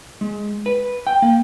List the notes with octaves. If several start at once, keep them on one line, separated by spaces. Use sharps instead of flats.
G#3
B4
G5
A#3